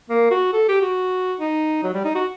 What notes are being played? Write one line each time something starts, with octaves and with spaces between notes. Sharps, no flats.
A#3
F#4
A4
G4
F#4
D#4
F#3
G3
D#4
F#4